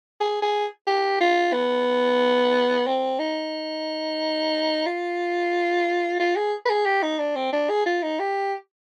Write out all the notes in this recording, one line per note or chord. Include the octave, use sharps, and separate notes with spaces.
G#4
G#4
G4
F4
B3
C4
D#4
F4
F4
G#4
B4
G#4
G4
D#4
D4
C4
D4
G#4
F4
D#4
G4